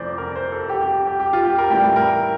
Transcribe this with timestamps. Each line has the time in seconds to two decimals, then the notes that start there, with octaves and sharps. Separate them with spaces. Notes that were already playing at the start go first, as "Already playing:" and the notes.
Already playing: F2 C3 E3 A3 C5 D5
0.18 A#4
0.36 C5
0.52 A4
0.70 G4
0.81 G4
1.07 G4
1.20 G4
1.33 F4
1.45 G4
1.58 A#4
1.70 A2 E3 G3 C4 E4 G4
1.96 A#4